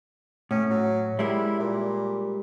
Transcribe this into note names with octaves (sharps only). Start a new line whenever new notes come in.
A2 C#4
F#3
G3 G#3 E4 A#4
A#2